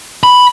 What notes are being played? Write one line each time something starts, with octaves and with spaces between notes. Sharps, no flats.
B5